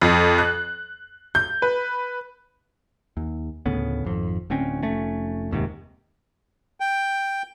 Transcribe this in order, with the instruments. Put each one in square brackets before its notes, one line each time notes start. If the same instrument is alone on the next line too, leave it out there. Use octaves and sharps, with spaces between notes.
[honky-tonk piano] F2
F#6
G6
B4
[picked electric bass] D#2
D2 A2 C#3 B3
G#1 F2
D1 D2 C4 C#4
F1 A3 C#4
F1 D#2 G#2 C3
[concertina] G5